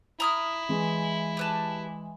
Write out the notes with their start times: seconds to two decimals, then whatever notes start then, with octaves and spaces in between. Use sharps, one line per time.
0.20 E4 A#5 D#6 F6
0.69 E3 G#3
1.37 G4 B4 A5